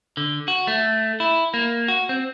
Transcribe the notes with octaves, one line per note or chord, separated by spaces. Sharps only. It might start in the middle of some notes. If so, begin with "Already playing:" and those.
D3
F#4
A3
E4
A#3
F#4
C4